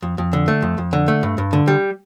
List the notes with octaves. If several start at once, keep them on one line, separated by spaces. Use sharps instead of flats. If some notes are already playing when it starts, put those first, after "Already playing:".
F2
F2
D3
A3
F2
F2
D3
A3
G2
G2
D3
G3